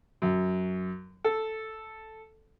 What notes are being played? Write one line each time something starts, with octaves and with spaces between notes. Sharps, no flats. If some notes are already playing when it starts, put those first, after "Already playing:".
F#2
A4